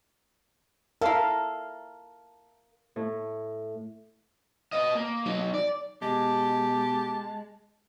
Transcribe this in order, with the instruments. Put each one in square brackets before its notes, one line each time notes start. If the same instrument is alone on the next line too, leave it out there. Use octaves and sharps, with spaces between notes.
[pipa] E4 A4 [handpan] A#4 F5
[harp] A2
[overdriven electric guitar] B3 D#5
A#3
F#3 D#4
D5
[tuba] B2 [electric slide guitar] G#3 [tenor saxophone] G4 [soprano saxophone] A5